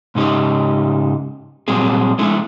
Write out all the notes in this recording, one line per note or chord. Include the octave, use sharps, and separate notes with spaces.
G#2 C#3 D#4 G4 D#5
A#2 F#3 G3 C4 G#4
G#3 A3 D4 E4